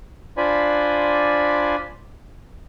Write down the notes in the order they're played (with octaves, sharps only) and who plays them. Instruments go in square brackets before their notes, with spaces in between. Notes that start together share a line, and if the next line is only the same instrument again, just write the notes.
[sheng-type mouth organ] D4 F4 C5 D5 G#5 B5